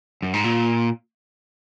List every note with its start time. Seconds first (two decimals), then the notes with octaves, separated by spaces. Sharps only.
0.22 F#2
0.33 G#2
0.44 A#2